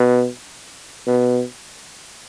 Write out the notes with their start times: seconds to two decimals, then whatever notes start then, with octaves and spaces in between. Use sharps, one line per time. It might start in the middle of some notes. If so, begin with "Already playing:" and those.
Already playing: B2
1.07 B2